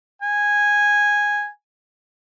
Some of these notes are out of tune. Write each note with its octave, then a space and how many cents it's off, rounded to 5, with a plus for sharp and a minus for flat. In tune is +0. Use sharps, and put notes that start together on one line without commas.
G#5 -10